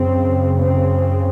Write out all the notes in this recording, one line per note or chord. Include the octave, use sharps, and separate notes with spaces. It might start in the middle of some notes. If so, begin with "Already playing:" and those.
Already playing: F#2 C#3 C4
C4